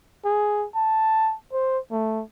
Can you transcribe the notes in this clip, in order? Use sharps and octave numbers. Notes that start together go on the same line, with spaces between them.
G#4
A5
C5
A3